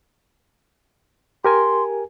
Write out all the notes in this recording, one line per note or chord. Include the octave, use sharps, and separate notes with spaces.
G4 A#4 G#5 C6